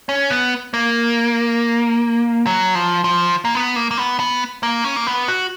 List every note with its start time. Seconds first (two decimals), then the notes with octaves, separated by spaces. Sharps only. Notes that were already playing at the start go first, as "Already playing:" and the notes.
0.09 C#4
0.30 B3
0.74 A#3
2.47 F#3
2.75 F3
3.04 F3
3.45 A#3
3.55 B3
3.76 A#3
3.91 A#3
3.98 B3
4.19 B3
4.63 A#3
4.84 C#4
4.96 A#3
5.07 B3
5.28 F#4